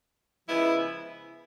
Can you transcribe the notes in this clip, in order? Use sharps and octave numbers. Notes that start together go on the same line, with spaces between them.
C#3 F3 G#3 B3 E4